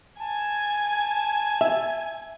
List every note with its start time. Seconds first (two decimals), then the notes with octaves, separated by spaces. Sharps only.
0.20 G#5 A5
1.61 E5